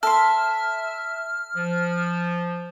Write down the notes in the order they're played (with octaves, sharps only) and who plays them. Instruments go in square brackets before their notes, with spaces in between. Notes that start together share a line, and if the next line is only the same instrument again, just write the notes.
[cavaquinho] A4 C6 [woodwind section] E5 [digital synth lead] F6
[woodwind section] F3